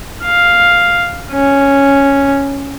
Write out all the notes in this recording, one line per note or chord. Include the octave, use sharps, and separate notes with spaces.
F5
C#4